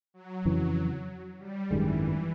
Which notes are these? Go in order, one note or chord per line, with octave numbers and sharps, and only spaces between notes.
F#3
F2 C#3 E3
G3
G#1 F#2 D#3 E3 G#3